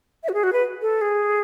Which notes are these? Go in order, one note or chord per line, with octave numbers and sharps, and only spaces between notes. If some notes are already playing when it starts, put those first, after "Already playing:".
E5
F#4
G#4
F#4
B4
A4
G#4